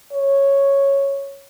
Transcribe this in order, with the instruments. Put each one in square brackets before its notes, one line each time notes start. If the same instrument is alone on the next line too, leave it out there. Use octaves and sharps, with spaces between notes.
[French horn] C#5